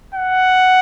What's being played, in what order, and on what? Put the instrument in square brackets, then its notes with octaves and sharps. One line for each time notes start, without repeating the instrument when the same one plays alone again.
[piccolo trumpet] F#5